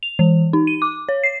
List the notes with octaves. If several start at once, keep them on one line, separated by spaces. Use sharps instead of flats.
F7
E3
D#4
D#7
D6
C#5
C7